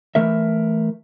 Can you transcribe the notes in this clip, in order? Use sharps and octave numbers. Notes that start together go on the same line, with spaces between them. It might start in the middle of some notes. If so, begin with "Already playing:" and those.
E3 A3 A#4 E5